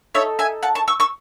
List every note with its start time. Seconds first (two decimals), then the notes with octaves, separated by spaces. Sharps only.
0.15 D#4 A4 C#5 E5
0.39 E5 G#5
0.63 F#5 A5
0.75 A5 C#6
0.88 C#6 E6
1.00 C#6 E6